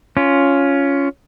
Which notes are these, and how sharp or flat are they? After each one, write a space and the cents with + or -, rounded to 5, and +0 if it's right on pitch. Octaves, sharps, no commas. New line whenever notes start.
C#4 +10 F4 +0